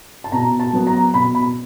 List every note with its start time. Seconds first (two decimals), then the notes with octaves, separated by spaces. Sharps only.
0.24 A5
0.32 B2 A#5
0.59 A5
0.73 F#3 B3
0.87 A#5
1.14 B2 B5
1.35 B5